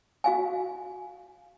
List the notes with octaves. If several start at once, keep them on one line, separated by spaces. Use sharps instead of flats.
F#4 F5 G#5